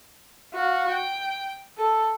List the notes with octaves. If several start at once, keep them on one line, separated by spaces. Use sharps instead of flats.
F#4 F5
G5
A4